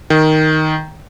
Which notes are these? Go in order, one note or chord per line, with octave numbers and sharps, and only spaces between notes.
D#3